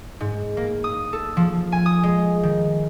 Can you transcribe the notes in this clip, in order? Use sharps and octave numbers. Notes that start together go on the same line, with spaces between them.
G#2
A#3
D#6
A4
F3
G#5
D#6
G#3
D#3